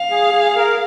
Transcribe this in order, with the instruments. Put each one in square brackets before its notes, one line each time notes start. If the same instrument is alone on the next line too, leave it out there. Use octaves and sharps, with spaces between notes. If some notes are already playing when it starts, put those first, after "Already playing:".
Already playing: [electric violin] F5
[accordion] G#4
G#4
A#4